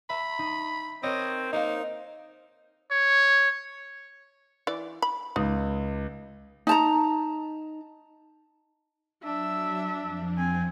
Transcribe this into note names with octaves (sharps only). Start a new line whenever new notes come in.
E5 B5
D#4
C4 A#4 C#5 D#5
A#3 D#4 A#4 C5 F5
C#5
E3 D5
B5
C#2 D#4
D#4 A5 A#5
F#3 D4 E5
F2 F3
C4 G#5